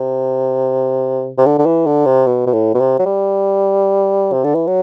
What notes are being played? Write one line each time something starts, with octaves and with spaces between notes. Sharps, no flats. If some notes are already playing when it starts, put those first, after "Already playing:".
Already playing: C3
C3
D3
D3
E3
D3
C3
B2
B2
A2
B2
C3
F#3
G3
C3
D3
E3
F#3